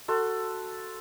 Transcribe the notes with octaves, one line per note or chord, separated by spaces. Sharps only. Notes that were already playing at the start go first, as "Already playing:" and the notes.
F#4 A4 C6